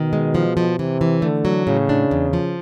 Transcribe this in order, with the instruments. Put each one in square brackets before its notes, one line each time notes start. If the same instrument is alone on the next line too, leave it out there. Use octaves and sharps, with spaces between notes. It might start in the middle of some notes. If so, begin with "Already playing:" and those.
Already playing: [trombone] B2 [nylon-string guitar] D#3
[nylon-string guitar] G#3
F3
F3
[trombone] C3 [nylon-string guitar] E3
[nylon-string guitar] E3
[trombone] D3 [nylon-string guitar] A3
[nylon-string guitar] F#3
[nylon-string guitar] A2 [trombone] C#3
[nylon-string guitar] D4
E2
F3